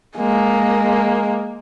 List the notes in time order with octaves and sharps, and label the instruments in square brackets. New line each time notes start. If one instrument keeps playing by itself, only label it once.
[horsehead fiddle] G#3 A#3